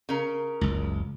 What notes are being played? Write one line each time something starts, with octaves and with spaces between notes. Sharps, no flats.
C#3 A#4
F#1 C#2